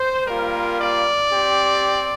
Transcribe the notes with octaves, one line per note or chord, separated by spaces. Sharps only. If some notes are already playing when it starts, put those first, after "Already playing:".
Already playing: C5
G3 A#3 F4 A#4
D5
C4 G4